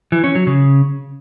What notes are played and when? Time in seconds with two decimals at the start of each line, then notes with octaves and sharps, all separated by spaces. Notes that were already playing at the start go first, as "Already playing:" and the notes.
0.12 E3
0.24 C#4
0.35 F#3
0.47 C#3